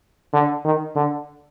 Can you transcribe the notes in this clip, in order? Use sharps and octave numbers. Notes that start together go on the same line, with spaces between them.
D3
D#3
D3